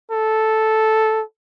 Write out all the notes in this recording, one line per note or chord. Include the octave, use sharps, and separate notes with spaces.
A4